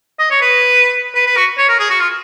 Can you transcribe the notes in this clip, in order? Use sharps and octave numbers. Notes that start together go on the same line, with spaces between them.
D#5
C#5
B4
B4
B4
F#4
C#5
A#4
G#4
F#4
F4